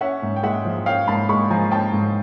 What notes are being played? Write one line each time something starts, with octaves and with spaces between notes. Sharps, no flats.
C#4 E5 F#5
G#2
G5
G#3 E5 F#5
F3
C#4 F5 G5
G#2 A5 B5
G#3 B5 C#6
F3 G#5 A#5
C#4 G5 A5
G#2